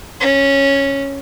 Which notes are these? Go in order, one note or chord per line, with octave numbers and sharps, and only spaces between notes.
C#4